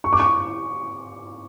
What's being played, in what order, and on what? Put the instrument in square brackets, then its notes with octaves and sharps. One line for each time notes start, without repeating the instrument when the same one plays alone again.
[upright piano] C#6
D6
C#6